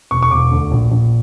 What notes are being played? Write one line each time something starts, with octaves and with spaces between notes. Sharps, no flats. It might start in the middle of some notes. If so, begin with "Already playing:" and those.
E1 C#6
C#6
E1 D6
D2
A#1
A#1